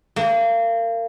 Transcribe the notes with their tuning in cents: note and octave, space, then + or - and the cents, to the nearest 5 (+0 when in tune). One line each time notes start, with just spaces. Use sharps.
A#3 -30